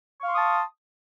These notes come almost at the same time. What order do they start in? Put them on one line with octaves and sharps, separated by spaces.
C#6 F5 C6 D#6 A5